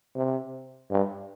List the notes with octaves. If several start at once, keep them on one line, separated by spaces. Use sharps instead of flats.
C3
G2